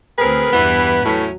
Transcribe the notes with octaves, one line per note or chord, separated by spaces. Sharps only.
D2 C4 G#4 A#4 B4
E2 G2 E3 B3
A2 F#3 A3 C#4 E4